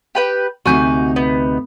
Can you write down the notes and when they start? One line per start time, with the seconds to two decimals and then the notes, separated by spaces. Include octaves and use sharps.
0.15 G4 B4 G5
0.66 D2 C3 D#4 F#4 G#5 G6
1.16 B3